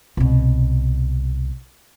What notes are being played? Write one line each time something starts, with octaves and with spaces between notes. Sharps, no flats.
C2 B2